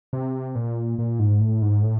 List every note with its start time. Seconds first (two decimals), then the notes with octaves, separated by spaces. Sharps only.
0.13 C3
0.55 A#2
0.99 A#2
1.19 G#2
1.40 A2
1.62 G#2
1.83 A2